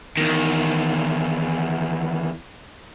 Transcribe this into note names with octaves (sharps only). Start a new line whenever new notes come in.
E2 D#3